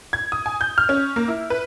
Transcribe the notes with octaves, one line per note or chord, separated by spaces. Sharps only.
G#6
D#6
G#5
G6
F6
C#4
A#3
E4
B4